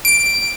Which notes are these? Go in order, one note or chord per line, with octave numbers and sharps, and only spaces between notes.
D7